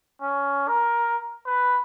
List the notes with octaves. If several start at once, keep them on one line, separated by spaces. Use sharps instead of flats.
C#4
A#4
B4